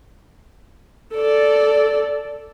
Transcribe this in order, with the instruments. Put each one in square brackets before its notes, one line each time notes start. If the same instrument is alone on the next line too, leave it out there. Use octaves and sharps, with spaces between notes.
[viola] A4 D5